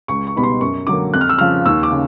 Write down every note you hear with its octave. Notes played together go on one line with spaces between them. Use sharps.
C#2 C#6
C#6
B2 G3 B3 D#4 B5
C6
F#2 C#6
D3 F#3 A#3 D6
F2 F#6
F6
E6
C#3 F3 F6
D#2 E6
D6
C#3